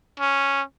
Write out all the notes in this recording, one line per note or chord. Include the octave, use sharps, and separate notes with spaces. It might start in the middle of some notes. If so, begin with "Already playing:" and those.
C#4